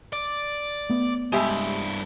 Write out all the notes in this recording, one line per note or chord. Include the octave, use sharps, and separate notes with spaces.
D5
A3 B3
G2 G#3 E4 G4 E5